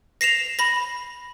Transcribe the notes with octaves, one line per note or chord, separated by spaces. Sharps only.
A#6 C7 E7 F7
B5 A#6